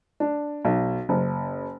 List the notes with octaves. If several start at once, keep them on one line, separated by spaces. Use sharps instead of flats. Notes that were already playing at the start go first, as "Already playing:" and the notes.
D4
B1
F#1